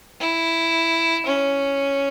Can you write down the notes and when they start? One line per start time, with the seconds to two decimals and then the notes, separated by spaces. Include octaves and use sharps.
0.20 E4
1.27 C#4